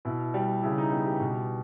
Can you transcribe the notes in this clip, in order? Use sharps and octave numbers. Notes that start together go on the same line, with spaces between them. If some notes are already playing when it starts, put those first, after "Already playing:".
B2 E4
G3 G4
C#3 E4
D#4
G3 B3
G4
B2